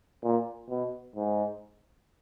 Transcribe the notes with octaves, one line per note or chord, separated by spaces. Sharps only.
A#2
B2
G#2